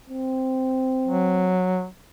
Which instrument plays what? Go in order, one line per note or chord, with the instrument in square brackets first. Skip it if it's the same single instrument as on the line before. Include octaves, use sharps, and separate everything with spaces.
[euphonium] C4
[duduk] F#3